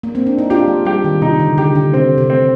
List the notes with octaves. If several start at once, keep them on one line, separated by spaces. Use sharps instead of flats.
A#3
C4
D4
D#4
D4 F4 G4
G#3
G3 G4
D#3
C3 D#4
D3
D3 G4
D3
C3 C4
C3
C4